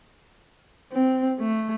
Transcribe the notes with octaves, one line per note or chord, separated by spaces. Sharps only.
C4
A3